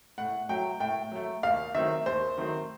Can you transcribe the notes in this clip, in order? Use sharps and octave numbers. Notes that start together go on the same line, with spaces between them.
A2 F#5
F#3 A3 G5
A2 G5
F#3 A3
D#2 F5
D#3 F#3 A3 C4 E5
D#2 C5
D#3 F#3 A3 C4